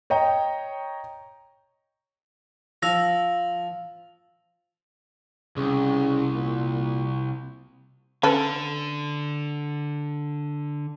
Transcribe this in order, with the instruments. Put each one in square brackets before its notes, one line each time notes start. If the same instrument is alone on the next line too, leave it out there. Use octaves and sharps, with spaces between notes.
[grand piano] C#5 D#5 G5 A#5
[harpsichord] F3 [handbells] E6 A#6
[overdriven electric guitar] C2 [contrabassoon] C#3
[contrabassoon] A#2
[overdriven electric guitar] D3 [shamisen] C#4 A4 B4